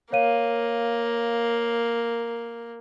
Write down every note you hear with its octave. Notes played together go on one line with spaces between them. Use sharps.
A#3 C#5 F5 D#7